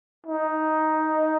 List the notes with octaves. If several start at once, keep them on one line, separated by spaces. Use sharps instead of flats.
D#4